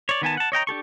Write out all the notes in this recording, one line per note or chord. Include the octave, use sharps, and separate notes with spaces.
C#5 D5
D#3 B3 G#5 A5
F#5 A5
C#5 D#5 G5 A#5
D4 G4 A4 C#6